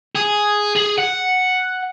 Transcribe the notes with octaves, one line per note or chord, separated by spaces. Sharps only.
G#4
G#4
F#5